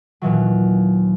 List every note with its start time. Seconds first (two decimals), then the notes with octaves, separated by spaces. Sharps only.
0.22 D#2 A#2 E3 F#3